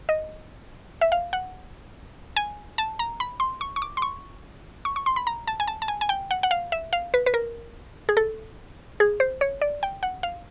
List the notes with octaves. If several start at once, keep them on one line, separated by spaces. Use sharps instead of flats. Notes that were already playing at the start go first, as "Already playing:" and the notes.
D#5
E5
F5
F#5
G#5
A5
A#5
B5
C6
C#6
C#6
D6
C6
C#6
C#6
C#6
C6
B5
A#5
A5
G#5
A5
A5
G#5
G#5
G5
F#5
F#5
F5
E5
F5
B4
B4
A#4
G#4
A4
G#4
C5
C#5
D5
G5
F#5
F5